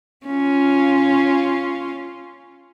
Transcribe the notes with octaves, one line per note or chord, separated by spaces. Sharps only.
C#4 F4